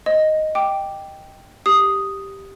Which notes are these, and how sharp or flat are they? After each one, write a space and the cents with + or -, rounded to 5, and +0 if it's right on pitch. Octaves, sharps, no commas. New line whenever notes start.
C5 +15 D#5 +0
G5 +0 D6 +0
G4 +0 D#6 +0